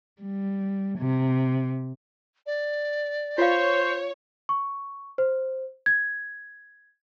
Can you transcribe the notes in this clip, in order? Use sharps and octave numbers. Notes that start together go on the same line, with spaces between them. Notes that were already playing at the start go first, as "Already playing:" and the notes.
G3
C3
D5
F4 C5 C#5 F5
C#6
C5
G#6